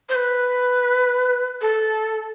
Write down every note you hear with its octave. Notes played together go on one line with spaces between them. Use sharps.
C5
B4
A4